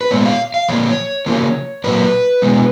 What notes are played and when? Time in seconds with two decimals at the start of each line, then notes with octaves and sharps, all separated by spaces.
0.01 B4
0.11 A#2 G#3 B3 C#5
0.26 F5
0.54 F5
0.68 A#2 F3 A#3 C#5
1.26 C#3 F3 A#3
1.84 A#2 F#3 A#3 B4
2.42 B2 G#3 B3